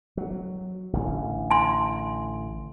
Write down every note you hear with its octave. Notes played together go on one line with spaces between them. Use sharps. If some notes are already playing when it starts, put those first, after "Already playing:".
F#3
A1 D3
G#5 C6